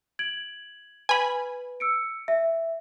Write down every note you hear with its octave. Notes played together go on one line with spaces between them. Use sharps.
G#6 D7 F#7
B4 G#5 B5
E6 C#7 D7
E5